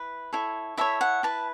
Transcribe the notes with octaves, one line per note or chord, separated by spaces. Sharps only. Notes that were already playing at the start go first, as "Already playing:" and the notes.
Already playing: E4 B4
E4 A4 C#5
E4 A4 C#5 E5
F#5
E4 B4 A5